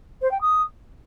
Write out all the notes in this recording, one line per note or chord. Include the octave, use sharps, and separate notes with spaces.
C5
G5
D#6